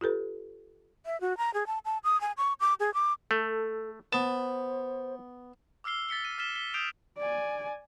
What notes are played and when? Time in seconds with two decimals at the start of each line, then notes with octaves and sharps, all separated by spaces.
0.01 F4 G4 A4 B4
1.06 E5
1.21 F#4
1.38 A#5
1.54 G#4
1.67 A5
1.85 A5
2.04 D#6
2.21 G#5
2.37 C#6
2.60 D6
2.80 G#4
2.94 D6
3.31 A3 A4
4.13 B3 C5 A5
5.84 D6 E6 F6 C7 G7
6.09 A6 B6 C#7 G7
6.25 D#7
6.38 F6 A6 B6 E7 G7
6.55 B6 G7
6.74 D#6 G6 C7 D7 F7
7.18 D5 G#5